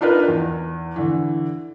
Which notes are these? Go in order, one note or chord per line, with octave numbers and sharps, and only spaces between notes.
D4 D#4 F4 A#4 B4
E2
D3 E3